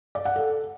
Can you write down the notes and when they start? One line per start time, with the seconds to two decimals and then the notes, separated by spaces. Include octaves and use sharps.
0.15 D5
0.25 F#5
0.36 A4